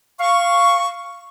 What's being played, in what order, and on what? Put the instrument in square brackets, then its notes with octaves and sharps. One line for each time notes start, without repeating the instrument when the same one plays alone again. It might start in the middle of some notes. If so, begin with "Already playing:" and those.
[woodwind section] F5 C#6